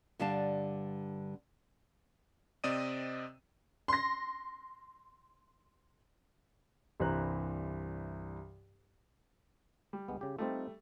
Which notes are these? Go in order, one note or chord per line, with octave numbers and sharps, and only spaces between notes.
G2 D3 G3 D5 F5 A5
C3 C4 D5 D#5 D#6 D#7
C6 A#6
C2 G2 E3 C5 A#5 F#6
G3
D2 G#3 B3
C#3 G4
G3 A3 C4 D#4 F4